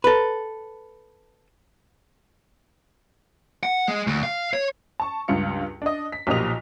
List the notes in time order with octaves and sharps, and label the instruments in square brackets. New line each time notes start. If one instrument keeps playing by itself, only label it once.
[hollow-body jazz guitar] A4 B4
[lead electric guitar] F#5
G#3
D2
F5
C#5
[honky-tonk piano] A5 C#6
C#2 G2 F4 C#7
D4 D#5
B6
B1 A#2 F3 G4 D#5 F7